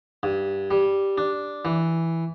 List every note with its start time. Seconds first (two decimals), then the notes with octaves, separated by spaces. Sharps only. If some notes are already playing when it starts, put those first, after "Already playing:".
0.23 G2
0.71 G3
1.18 D4
1.65 E3